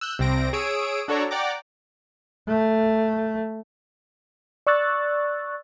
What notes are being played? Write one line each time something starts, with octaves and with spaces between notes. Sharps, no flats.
E6 F#6 G6
C2 C3 C4 A#6 D7
G#4 C#5 D#6 E6 D7
D4 F#4 A4 C#5 D5 A#5
D5 F#5 G5 A#5 D6
A3
D5 C#6 E6 F#6 A6